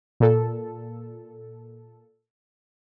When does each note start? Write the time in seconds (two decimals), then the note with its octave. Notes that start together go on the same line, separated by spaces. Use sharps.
0.20 A#2 A4